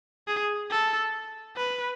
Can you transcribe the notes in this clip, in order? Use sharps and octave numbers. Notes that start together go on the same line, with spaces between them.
G#4
A4
B4